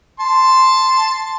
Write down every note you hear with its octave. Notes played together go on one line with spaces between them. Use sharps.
A5 C6